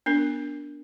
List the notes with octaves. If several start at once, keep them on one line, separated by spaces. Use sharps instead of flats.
B3 D4 A#4